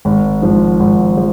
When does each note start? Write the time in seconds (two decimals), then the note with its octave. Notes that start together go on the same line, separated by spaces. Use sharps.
0.05 G#1
0.42 G#2 F3
0.80 G#1
1.17 F3